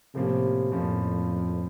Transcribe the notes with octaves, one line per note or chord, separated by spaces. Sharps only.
A2 C3 F3 A#3 C#4
F2 A2 F3 A#3 C#4